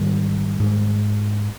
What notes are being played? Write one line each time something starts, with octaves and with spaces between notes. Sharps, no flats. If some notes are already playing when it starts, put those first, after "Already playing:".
Already playing: G#2 D#3 G3
G#2